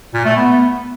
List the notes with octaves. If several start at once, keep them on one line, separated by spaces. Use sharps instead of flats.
A#2
A3
B3